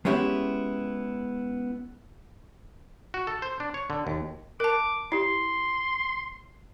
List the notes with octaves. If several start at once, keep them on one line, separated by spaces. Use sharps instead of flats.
G#3 B3 C#4 E4 G4
F#4
A4
C5
D4
C#5
D3
D#2
A#4 A5 D6
E4 G4 C6